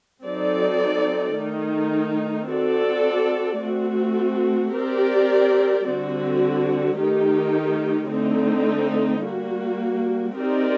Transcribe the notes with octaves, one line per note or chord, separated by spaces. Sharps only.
F#3 C4 D#4 A4 D5
D#3 A3 D#4
C4 F#4 A4 D5
A3 C4 F#4
C4 G4 A#4 D5
D3 G3 C4 F#4
D#3 A3 D#4 G4
D3 A3 C4 D#4
G3 A#3 F#4
C4 D#4 G4 A#4 D5